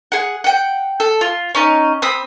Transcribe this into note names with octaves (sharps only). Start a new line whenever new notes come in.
G#4 F#5
F#5 G5
A4
F4
C#4 D#4 D#5
C4 B5 D#6